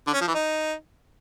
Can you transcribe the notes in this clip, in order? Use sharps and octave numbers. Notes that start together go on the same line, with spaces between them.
D3
C#4
F3
E3
D#4